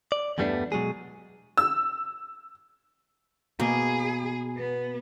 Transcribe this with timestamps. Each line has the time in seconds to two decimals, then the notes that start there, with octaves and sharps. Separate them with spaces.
0.12 D5
0.38 E2 G2 G3 A3 B3 D4
0.72 B2 F#3 G#3 G#4
1.57 E6
3.60 B2 A#3 G#4
4.57 B3